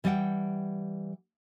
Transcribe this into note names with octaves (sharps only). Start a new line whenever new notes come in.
E3 G3 D5 D#5 F#5 G5